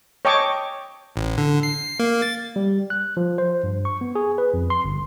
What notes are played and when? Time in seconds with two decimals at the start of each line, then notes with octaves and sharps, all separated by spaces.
0.25 C#5 D#5 G5 A5 C#6 D6
1.16 A1
1.38 D3
1.63 C7
1.99 A#3
2.22 A6
2.56 G3
2.90 F#6
3.17 F3
3.38 C5
3.64 G2
3.85 C#6
4.01 B3
4.15 G#4
4.38 B4
4.54 F2
4.70 C6
4.84 G1